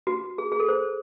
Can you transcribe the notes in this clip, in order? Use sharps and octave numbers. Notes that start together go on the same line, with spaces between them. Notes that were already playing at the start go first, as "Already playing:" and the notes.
F#4
G#4
G#4
A4
C5